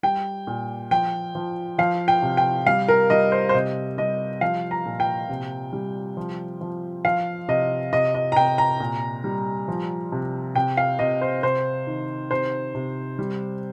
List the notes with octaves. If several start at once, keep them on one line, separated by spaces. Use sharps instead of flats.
G3 G5
A#2
F3 G5
F3
F3 F5
G5
C3
G5
G3 F5
A#4
G3 D#5
C5
C5
C3 D#5
G3 D#5
F3 F5
A#5
A#2
G5
C3
G3
F3
F3
F3 F5
C3 D#5
C3 D#5
D#5
A#5
C3 G5
A#5
A#2
G3
F3
C3
C3 G5
F5
C3 D#5
C5
C3 C5
D#3
C3 C5
C3
G3